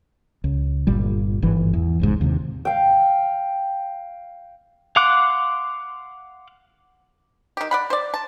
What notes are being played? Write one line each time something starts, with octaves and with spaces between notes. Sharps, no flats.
C#2
G1 A#2 G3
G1 G#2 E3
E2
F1 C#2 G#2
D#2 C3
F5 G5
F5 F#5 C6 D6 F#6
D#3 G4
D5 F#5 B5
C5 D5
A5